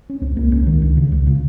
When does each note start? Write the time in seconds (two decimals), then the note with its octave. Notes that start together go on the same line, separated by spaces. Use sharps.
0.10 C#4
0.21 C#2 C4
0.37 C#2 A#3
0.52 C#2 C#4
0.67 C#2 D#3
0.82 C#2
0.97 C#3
1.12 C#2
1.27 C#3